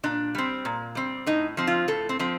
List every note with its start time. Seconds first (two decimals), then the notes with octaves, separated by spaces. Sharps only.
0.03 A#2 D4
0.35 G3 C4
0.65 A#2
0.95 G3 C4
1.26 A2 D#4
1.57 F3 C4
1.67 F4
1.88 A2 A4
2.09 C4
2.19 F3 C4